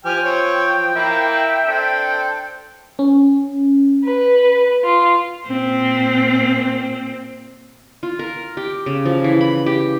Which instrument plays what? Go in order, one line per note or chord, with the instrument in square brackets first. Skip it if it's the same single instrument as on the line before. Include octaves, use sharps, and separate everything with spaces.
[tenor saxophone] F3 [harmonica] G4 G#5 F6 [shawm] G5
[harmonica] C4 C#5
[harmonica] A#3 E4 [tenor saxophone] E5
[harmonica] C4 D4 A4
[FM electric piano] C#4
[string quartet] B4
F4
[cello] A#2 C4
[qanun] F4
A#4
G4
C#3
F3
E3
B5
G4